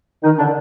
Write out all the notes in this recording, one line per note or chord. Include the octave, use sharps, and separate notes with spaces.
D#3 D#4
D3 D4